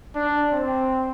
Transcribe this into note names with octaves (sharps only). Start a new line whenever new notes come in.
D4
C4